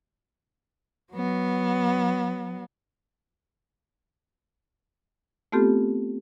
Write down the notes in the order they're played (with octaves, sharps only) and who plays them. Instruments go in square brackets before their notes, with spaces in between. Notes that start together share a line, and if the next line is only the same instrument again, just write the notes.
[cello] F#3 B3
[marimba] A3 B3 C4 F4 G4 A4